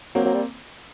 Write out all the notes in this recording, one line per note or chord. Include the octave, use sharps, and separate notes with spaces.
F#3 A#3 C4
F#3
G3